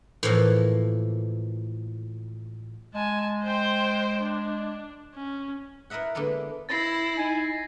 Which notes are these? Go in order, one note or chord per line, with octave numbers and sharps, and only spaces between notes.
A2 E3 F3 A#3
G#3 G#5 A5
C5 G5
D4
C#4
E4 A#4 D#5 E5 F#5
D3 G#3 A#3 B3 A4
E4 A6 A#6 C7
D#4 G#5